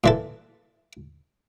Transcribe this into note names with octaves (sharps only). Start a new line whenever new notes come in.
A#2 E3 A4